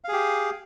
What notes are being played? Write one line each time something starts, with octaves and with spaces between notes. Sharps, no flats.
G4 G#4 F5